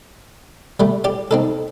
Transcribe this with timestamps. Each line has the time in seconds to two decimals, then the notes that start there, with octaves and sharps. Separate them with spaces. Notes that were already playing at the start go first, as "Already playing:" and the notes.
0.80 G3 A3
1.04 G4 D5
1.31 C4 D#4 A4